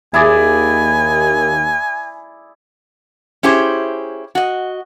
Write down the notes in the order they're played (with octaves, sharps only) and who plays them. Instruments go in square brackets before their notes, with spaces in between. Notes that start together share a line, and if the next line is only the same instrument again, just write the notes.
[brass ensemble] D#2 [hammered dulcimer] E4 G#4 D5 [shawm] G#5
[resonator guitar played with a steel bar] C#4 E4 G4 G#4 C5
F#4 D#5